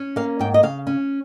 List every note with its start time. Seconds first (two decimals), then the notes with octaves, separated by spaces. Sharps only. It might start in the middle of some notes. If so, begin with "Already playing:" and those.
Already playing: C#4
0.16 A#3 F5
0.39 G#2 G5
0.54 D#5
0.63 C#3 F5
0.87 C#4